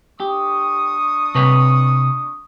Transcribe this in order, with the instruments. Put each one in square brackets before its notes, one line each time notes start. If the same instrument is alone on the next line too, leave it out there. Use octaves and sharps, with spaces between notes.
[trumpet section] D4 C#6 D#6 [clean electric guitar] G4
[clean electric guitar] C3 B4 C#5